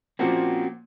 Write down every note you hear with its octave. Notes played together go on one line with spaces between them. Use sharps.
A#2 F3 A#3 C4 C#4 F#4